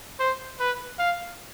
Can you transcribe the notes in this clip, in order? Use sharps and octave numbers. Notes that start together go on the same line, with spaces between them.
C5
B4
F5